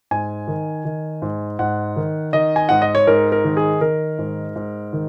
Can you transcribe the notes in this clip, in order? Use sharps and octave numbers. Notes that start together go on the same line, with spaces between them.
G#2 G#5
D#3
D#3
G#2
G#2 F#5
D#3
D#3 D#5
G#5
G#2 F#5
D#5
C#5
G#2 A#4
A#4
D#3
G#4
D#3 A#4
G#2
G#2
D#3